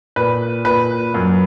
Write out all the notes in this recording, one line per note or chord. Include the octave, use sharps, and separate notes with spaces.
A#2 B4
A#2 B4
F#2